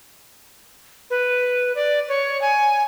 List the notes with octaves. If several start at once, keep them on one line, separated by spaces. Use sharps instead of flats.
B4
D5
C#5
G#5